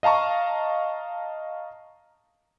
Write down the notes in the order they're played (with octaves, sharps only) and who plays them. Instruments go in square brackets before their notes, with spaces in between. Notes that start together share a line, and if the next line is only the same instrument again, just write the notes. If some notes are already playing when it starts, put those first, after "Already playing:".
[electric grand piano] D#5 F5 A5 A#5 C#6